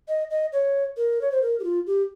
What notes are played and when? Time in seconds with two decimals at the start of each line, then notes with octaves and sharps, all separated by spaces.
0.08 D#5
0.30 D#5
0.53 C#5
0.97 A#4
1.21 C#5
1.32 C5
1.42 A#4
1.60 G4
1.64 F4
1.87 G4